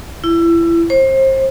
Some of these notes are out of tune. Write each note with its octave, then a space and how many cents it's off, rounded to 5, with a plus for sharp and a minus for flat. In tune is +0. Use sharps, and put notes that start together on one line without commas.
E4 +25
C5 +30